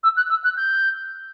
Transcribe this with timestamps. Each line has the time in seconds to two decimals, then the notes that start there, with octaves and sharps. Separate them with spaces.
0.03 E6
0.17 F#6
0.30 E6
0.44 F#6
0.57 G6